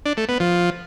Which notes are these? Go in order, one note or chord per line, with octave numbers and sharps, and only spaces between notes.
D4
A3
B3
F3